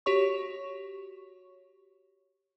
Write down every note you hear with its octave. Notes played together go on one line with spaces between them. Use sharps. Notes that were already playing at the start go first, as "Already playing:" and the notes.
F#4 G4 C#5 C#6